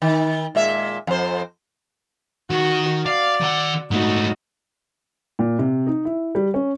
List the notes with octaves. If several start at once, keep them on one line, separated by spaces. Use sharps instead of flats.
D#3
A#2 G#3 E5
F2 C5
D#3 F#4
D5 F5
D#3 F#5
G#2 A3 D#4 F#4
A#2
C3
D#4
E4
G3
C#4